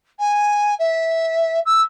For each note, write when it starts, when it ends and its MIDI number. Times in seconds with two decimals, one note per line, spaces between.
0.19 0.74 80
0.79 1.59 76
1.65 1.81 88